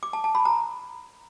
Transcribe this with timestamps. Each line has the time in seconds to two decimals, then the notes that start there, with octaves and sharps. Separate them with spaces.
0.03 D6
0.13 A5
0.24 A5
0.35 B5
0.45 A#5